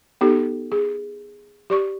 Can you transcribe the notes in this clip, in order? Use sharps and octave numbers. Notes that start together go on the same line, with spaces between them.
B3 D#4 G4 A4
G#4
G4 D5 C#6